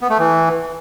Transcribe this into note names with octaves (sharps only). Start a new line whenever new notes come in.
B3
A3
E3